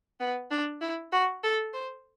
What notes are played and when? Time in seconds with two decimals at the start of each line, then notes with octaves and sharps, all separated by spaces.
0.20 B3
0.51 D4
0.81 E4
1.12 F#4
1.43 A4
1.74 C5